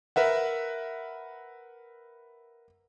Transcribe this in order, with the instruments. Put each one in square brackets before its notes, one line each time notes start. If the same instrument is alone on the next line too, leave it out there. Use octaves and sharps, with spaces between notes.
[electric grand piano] A#4 B4 E5 F#5